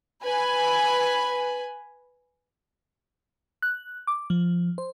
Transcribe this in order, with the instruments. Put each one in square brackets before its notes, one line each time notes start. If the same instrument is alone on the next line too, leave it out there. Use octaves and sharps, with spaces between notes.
[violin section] B4 G#5 B5
[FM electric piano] F#6
D6
F3
C5